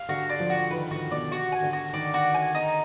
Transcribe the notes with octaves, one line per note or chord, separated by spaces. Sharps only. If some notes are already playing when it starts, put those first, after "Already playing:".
Already playing: F5
D3 F#4
D5
F3
F#4
D#3 B4
D3 F#4
B2 D5
F#4
G#5
D3
F#4
D#3 D5
F#4
G#5
D#4